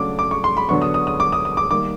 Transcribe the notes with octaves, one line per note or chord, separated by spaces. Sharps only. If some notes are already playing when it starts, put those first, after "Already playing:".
Already playing: C#3 F#3 A3 D4 D6
D6
C#6
C6
B5
D3 F#3 B3 D4 C#6
D#6
D#6
D#6
D6
D#6
D#6
D6
D#3 G3 A#3 D6